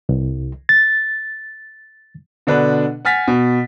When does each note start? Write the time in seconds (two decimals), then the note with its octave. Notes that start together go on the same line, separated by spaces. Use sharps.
0.09 C2
0.69 A6
2.47 B2 D3 D4 B4
3.05 F#5 G#5 F6 A6 B6
3.28 B2